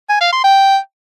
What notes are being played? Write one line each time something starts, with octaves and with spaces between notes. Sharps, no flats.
G#5
F5
C6
G5